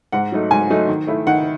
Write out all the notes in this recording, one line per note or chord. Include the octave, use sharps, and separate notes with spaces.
G#2 F#5
F#3 A3 D#4
G#2 G#5
F#3 A3 D#4
D#3
A3 E4
D#3 F#5